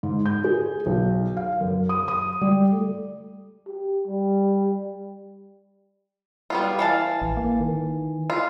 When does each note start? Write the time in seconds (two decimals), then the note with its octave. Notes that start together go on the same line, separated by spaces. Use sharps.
0.03 G#2
0.26 G6
0.44 G#4
0.86 B1
1.37 F5
1.61 F#2
1.89 D#6
2.08 D#6
2.41 G3
2.72 A3
3.67 G4
4.07 G3
6.50 G3 B3 F4
6.79 E3 F5 A5
7.22 A1
7.37 A#3
7.60 D#3
8.30 F4